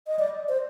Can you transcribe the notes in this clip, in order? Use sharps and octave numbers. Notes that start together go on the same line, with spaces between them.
D#5
D5
C5